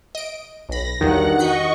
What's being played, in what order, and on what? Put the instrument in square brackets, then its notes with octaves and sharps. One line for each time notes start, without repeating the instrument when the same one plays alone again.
[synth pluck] D#5 D7
[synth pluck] B1 B5 [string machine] A#6
[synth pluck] E2 F#3 [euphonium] G2 [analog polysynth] D#3 [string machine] F#5
[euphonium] F#4 [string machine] D#5 C#6 [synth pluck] G6 B6 C#7